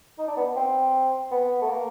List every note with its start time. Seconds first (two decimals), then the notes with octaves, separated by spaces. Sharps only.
0.18 D#4
0.28 D4
0.37 B3
0.56 C4
1.31 B3
1.61 A3
1.69 A#3